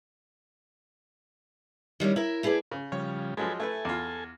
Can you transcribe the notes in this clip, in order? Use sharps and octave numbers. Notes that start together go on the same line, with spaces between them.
D#3 G3 C#4 E4
E4 A#4 E5
A3 E4 G#4 B4 D5
C#3
C#3 F3 G3 C#5
F3 F#3 G#3 A4 B4 G#5
A3 E4 A4 B4 G#5
E2 F4